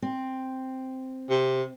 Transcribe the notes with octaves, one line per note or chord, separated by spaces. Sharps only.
C4
C3